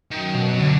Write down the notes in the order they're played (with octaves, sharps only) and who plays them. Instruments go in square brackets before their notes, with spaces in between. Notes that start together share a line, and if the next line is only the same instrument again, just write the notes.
[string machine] F#2 F#3 [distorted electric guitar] D#3
[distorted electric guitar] B2
D3